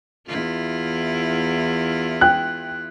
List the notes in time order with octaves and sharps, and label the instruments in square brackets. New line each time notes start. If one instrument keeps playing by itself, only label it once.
[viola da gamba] E2 E4 F4
[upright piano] G5 F#6